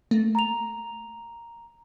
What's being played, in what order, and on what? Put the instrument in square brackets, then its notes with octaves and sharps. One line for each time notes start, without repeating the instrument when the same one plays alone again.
[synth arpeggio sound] A3 A#3
[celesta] A#5 F7